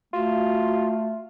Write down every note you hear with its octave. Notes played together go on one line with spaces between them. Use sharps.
A3 F4 F#4